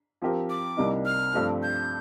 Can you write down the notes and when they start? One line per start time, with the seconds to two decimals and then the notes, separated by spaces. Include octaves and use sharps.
0.22 F3 C4 G4 A#4
0.50 D6
0.77 C2 C3 G3 A#3 D#4
1.06 F6
1.33 G2 F3 A3 C4
1.63 G6